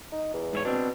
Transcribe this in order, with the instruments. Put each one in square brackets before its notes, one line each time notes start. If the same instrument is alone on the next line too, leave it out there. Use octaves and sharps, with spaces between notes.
[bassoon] D#4
E2
[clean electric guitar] G#2 E4 C#5
[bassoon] B2 [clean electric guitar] C4 D4